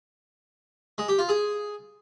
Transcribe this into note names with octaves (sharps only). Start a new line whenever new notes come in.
G#3
G4
F4
G#4